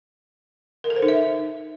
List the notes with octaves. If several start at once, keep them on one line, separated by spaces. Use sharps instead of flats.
A#4
A4
C5
D#4
E5